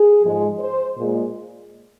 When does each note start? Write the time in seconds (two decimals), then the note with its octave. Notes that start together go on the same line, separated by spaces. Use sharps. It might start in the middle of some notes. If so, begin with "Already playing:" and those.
Already playing: G#4
0.23 G#2 F3 G#3
0.60 C5
0.97 A#2 G#3